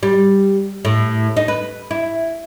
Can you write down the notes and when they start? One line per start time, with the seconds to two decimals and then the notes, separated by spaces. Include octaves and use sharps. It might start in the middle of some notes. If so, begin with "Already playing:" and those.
0.03 G3
0.85 A2
1.37 D#4
1.48 B4
1.91 E4